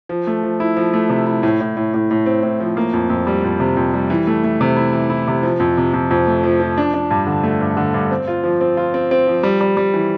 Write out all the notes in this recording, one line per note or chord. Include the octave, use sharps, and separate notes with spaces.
F3
A3
F3
E4
F3
A3
C3
E4
A2
A2
A2
A2
A2
C4
A2
F3
A#3
F2
F2
G3
F2
C3
F2
G3
E3
A3
A3
C3
E4
E3
E4
C3
F3
F2
C3
F2
F2
A3
F3
F3
D4
D4
G2
D3
A3
G2
D3
G2
C4
F4
F3
C4
F4
C4
C4
F3
G3
G3
G3
E3